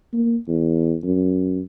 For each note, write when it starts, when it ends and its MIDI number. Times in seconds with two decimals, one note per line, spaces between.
0.14 0.37 58
0.48 0.96 40
1.04 1.61 42